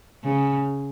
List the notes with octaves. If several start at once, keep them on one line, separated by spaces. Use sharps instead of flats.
C#3